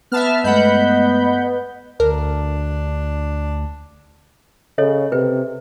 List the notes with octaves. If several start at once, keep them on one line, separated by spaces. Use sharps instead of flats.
B3 E5 A5 B5 F6 F#6
G2 G#3 A3 D#5 F#5 B5 G6
D2 D4 A#4
C#3 A4 C#5 D#5
C3 B4